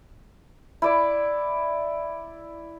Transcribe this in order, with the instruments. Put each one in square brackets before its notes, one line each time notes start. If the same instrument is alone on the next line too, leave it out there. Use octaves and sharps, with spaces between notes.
[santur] E4 D5